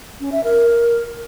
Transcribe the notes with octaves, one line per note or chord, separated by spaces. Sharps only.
C#4
E5
A#4